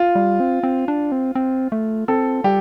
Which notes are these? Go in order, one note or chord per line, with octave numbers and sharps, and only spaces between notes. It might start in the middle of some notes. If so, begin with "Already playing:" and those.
Already playing: F4
G3
C4
C4
D4
C4
C4
A3
C4 A4
G3 G4